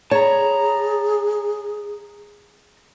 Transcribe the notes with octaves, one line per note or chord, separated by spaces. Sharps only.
G#4 C#5 A5 A#5